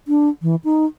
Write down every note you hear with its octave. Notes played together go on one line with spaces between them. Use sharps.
D4
E3
D#4